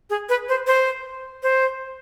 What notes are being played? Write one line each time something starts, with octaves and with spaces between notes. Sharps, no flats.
G#4
B4
C5
C5
C5